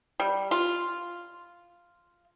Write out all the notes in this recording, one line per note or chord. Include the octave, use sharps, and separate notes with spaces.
G3
F4